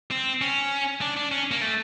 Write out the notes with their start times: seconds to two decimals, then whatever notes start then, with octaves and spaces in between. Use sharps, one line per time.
0.11 C4
0.41 C#4
1.01 D4
1.16 D4
1.31 C#4
1.51 A#3
1.61 A3